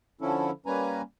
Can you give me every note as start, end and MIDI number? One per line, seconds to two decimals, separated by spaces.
0.21 0.51 50
0.21 0.51 53
0.21 0.51 61
0.21 0.51 64
0.21 0.51 69
0.66 1.02 55
0.66 1.02 58
0.66 1.02 61
0.66 1.02 71
0.66 1.02 80
0.66 1.02 82